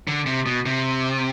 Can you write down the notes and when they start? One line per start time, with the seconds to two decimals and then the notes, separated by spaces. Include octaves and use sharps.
0.08 D3
0.26 C3
0.46 B2
0.66 C3